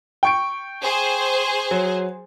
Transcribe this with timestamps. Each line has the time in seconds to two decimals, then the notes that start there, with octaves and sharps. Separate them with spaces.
0.23 G5 C#6 D7
0.83 G#4 C5
1.71 F#3